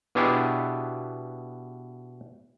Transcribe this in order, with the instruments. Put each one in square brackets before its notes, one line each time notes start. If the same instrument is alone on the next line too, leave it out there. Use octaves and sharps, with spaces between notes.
[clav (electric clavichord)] B2 B3 D4 E4 G4 G#4